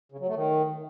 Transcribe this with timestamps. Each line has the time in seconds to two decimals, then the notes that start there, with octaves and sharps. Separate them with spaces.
0.12 C#3
0.20 F#3
0.27 A3
0.35 D#3